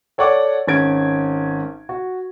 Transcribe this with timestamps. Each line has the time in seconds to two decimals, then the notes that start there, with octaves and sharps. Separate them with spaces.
0.18 A4 C#5 D5 F#5 C#6 D6
0.67 G#1 C#4 G#6 D7
1.89 F#4